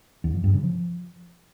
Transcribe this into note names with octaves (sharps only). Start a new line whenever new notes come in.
E2
F2
G2
C#3
F3